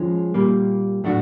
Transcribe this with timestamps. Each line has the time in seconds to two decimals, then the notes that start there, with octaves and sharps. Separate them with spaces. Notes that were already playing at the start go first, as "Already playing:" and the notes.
Already playing: F3 G#3 C#4
0.34 A#2 G3 A#3
1.04 A2 F#3 A3 D4 F#4